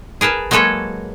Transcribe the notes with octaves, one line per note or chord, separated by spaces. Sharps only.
G#4 A#4 B4 A5
F#3 G#3 A#3 A4 B4 C#5